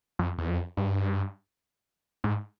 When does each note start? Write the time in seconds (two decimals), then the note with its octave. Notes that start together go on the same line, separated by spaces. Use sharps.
0.19 F2
0.38 E2
0.49 F2
0.77 G2
2.24 G#2